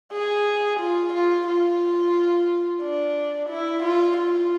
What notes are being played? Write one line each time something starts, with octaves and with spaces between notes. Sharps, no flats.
G#4
F4
F4
F4
D4
E4
F4
F4